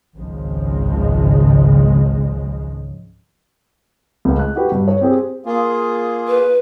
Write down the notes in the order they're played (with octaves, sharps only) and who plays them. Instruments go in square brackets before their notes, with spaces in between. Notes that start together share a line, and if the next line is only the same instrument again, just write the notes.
[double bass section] G#1 C#2 C#3 F3 G#3
[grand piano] C#2 F5
F#6
F#4 G4 B4
G2
C#5
C4 G4 G#4 C5
[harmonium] A#3 F4 G#4
[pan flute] B4